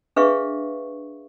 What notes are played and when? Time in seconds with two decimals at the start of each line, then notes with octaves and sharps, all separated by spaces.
0.16 D4 G#4 B4 E5 F5 C#6